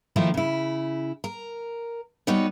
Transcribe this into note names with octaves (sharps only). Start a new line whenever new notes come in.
D#3 F3 A3 A#3 D#4 E4
C#3 E4
A#4
G3 B3 D#4 F#4 C#5